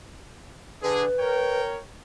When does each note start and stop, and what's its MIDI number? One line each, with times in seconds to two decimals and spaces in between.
0.83 1.05 50
0.83 1.05 68
0.83 1.61 71
1.19 1.80 70
1.19 1.80 73
1.19 1.80 79